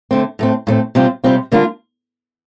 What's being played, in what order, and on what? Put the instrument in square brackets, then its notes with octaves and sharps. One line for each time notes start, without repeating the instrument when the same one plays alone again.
[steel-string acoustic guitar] D3 A3 C4
A2 A3 C4
A2 A3 C4
C3 G3 C4 F4
C3 G3 C4 F4
D3 G3 A#3 D4 F4